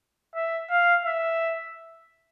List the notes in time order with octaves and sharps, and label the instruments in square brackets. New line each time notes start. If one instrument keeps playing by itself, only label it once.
[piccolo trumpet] E5
F5
E5